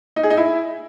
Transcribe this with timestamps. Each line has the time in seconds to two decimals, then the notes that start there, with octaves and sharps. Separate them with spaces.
0.16 D#4
0.23 G#4
0.30 D#4
0.37 E4